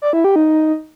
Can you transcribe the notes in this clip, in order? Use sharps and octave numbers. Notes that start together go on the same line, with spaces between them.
D5
E4
G4
D#4